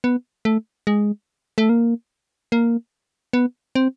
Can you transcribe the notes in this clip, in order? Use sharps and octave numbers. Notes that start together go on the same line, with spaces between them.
B3
A3
G#3
A3
A#3
A#3
B3
C4